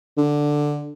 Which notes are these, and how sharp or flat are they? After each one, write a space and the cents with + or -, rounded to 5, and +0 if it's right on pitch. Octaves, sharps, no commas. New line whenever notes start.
D3 +5